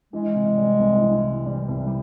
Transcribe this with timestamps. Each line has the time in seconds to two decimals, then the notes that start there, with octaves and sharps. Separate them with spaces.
0.13 E3 G#3
0.35 C3
0.57 G3
0.79 C2
1.01 E3
1.24 C3
1.46 G3
1.69 C2
1.87 G3